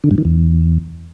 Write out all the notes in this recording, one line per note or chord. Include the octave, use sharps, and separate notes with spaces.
D3
G2
D#3
E2